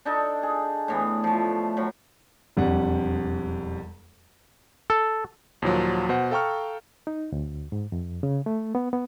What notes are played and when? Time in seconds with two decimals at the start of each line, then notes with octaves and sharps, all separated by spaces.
0.05 D4 D#4 A4
0.43 G#4
0.88 A2 E3 B3
1.24 F3 A3
1.77 A2 F#3
2.57 E1 F2 G3 F#5
4.90 A4
5.62 D#2 A#2 F3 F#3
6.09 B2 C5 F#5
6.31 A4 F5 G5 A#5 C#6 F6
7.07 D#4
7.32 D2
7.72 G#2
7.92 F2
8.23 C#3
8.46 A3
8.75 B3
8.93 B3